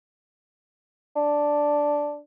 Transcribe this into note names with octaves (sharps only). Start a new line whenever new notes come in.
D4